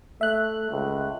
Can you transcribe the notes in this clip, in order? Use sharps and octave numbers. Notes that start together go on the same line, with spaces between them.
A3 E5 F#6
C#2